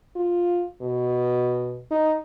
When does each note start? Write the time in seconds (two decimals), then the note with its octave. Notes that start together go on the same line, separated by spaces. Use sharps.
0.16 F4
0.81 B2
1.91 D#4